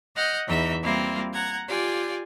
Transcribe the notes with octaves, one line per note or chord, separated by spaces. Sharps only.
D#5 F#5 F6 G6
E2 E3 D#4 E5
G3 A#3 C4 E4 F4 F5
F#5 A#5 G#6
F4 G4 D5 G#5